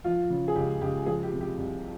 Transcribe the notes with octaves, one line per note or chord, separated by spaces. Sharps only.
F3 F4
C#3
G#4
C#2 G4
C#2 G4
F3 G#4
G4
C3
G4
C2